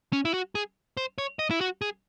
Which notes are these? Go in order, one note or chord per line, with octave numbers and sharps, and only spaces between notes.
C#4
E4
F#4
G#4
C5
C#5
D#5
E4
F#4
G#4